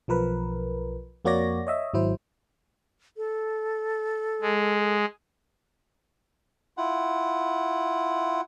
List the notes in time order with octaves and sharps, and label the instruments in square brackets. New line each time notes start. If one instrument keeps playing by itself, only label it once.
[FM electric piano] B1 F3 A#4 B4
F2 A#3 F#4 C#5 D5 A#6
C#5 D#5 E5
G#1 F#3 E4 C5
[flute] A4
[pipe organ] G#3
[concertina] E4 F4 F#5